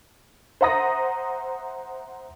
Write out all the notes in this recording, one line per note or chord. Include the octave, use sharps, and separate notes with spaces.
C5 E5 F#5 A#5 D#6 A#6